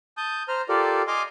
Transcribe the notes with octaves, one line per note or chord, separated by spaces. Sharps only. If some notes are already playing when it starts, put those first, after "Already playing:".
A5 D#6 G6
C5 A#5 F6
F4 G4 A4 A#4 D5
D#5 G#5 C6 D6 F6